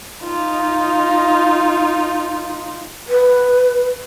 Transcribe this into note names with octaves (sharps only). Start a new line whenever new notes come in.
D#4 F4
B4